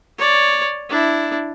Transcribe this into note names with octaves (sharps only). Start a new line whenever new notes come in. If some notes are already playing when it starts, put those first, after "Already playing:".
C#5 D5
D4 E4